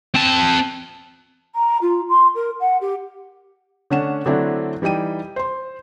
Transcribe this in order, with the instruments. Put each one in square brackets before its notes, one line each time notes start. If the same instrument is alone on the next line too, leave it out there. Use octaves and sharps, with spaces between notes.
[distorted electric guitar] C4 A5
[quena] A#5
F4
C6
A#4
F#5
G4
[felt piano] D3 A3 C#4 D4 F#5 E7
D3 F#3 A3 C4 D4 E4
E3 G3 D#4 G5 D#7
C5 C6